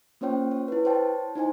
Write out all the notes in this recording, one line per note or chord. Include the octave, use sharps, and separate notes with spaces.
A#3 C#4 F4 C5 C#5 G5
C#5
E4 B4
C5 C#5 G5 A5
D#4 E4 C5 G#5